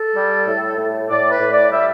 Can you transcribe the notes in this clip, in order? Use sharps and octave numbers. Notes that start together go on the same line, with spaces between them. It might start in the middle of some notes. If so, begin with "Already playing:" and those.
Already playing: A4
G3
A2
A2
A2 D5
B4
A2
D5
G3 E5